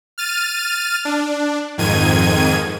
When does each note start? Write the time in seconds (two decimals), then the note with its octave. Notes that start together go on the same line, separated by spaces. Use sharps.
0.18 F6 A6 D#7
1.05 D4
1.78 F2 G#2 D#3 G#6 D#7